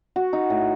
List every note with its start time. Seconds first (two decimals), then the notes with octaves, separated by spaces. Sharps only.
0.16 F#4
0.33 D#4
0.50 A2